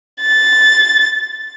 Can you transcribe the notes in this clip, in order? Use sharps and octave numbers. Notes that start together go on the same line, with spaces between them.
A6